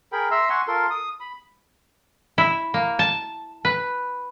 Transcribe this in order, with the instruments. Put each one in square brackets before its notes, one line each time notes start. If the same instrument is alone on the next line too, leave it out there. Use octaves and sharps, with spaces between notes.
[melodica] G#4 A#4 G5 B5
E5 A#5 C6 E6
F#5 G#5 C6 C#6
F4 A4 A#4 C6
D#6
B5
[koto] E4
A#3
A5
B4